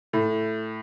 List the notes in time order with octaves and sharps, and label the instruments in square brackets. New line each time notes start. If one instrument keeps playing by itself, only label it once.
[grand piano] A2